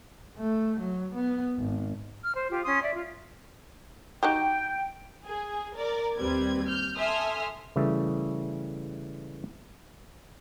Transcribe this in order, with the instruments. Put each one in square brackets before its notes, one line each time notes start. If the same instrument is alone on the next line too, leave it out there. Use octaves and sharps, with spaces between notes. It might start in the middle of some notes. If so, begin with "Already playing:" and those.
[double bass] A3
F#3
B3
G#1
[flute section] F6
C5
F4 G4
C#4 C6 D#6
D5 E5
F4
[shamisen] D#4 F#4 G4 [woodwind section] G5
[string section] G#4
A#4 D5
D#2 G3 C4 B4 G#6
F6 G6
A4 E5 G#5 C6 D#6 F6
[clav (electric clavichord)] C#3 E3 G3 A3